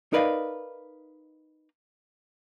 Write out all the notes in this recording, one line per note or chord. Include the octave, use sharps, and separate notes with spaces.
D#4 A#4 B4 D5 D#5 F5